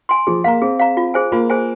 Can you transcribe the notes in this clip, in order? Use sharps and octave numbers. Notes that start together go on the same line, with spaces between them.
G#5 C6
F3 G#4
A#3 F5 A#5
C4 G#4
F5 A#5
F4
G#4 C5 G#5
A#3 F4
G#4 C5 G#5